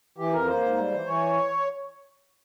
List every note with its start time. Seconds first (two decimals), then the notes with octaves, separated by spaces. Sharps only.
0.18 E3 G4
0.33 F2 A#4
0.47 A#3 C5
0.62 G#2
0.77 G3
0.92 E3
1.06 E3 C#5